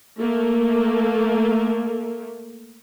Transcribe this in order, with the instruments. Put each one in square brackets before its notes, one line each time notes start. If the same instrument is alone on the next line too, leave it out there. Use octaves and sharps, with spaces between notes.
[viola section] A3 A#3